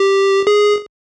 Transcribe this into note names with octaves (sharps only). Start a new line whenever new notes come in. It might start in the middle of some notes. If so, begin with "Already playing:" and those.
Already playing: G4
G#4